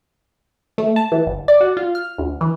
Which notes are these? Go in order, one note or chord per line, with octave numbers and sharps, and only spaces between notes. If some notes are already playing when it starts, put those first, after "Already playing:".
A3
A5
E3
G1
D5
F#4
F4
F6
D2
E3